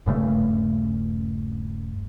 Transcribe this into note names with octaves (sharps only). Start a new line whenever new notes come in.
D#1 G2 C#3 A3